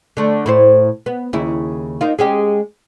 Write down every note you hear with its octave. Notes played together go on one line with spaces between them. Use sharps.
D3 A3
A2 E4 C5
B3
D#2 C#3 E4
A#3 D#4 F4
G#3 C#4 G4